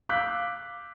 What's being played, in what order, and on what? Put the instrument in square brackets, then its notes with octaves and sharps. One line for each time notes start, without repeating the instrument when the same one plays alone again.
[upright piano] F5 D6 E6 F#6 G6 B6